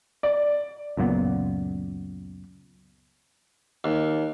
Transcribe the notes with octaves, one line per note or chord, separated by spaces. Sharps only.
D5
C#2 F#2 A#2 B3
D#2